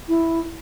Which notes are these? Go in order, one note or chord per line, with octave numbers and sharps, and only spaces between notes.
E4